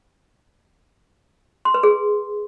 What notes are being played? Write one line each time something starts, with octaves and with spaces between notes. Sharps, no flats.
C6
B4
G#4